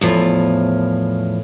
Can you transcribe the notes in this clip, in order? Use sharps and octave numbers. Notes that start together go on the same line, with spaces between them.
E2 A2 F3